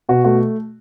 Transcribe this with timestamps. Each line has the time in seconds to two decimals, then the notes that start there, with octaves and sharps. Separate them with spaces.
0.09 B2 F#4
0.25 A3 F#4